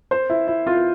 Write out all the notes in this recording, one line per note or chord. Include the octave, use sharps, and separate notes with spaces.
C5
E4
E4
F4